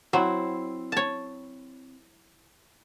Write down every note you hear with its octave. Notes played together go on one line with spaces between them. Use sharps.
F#3 C4 E4
C#5 A5